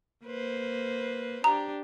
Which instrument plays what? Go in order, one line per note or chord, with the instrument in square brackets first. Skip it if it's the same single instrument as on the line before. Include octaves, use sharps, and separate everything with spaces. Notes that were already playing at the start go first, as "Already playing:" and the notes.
[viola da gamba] A#3 B4 C5
[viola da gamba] D4 G4 [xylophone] A#5